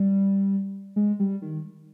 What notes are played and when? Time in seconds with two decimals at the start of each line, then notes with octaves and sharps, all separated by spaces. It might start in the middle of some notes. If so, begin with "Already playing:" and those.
Already playing: G3
0.96 G#3
1.19 G3
1.42 D#3